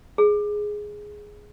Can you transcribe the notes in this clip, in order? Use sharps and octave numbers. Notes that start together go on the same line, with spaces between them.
G#4